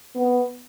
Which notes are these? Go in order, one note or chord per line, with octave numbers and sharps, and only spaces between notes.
B3